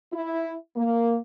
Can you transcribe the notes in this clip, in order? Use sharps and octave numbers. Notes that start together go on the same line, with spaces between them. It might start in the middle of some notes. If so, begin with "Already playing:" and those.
E4
A#3